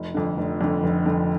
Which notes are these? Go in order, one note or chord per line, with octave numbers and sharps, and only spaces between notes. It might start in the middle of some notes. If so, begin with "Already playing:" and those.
Already playing: F1
F2 D3
F1
F2 D3
F1
F2 D3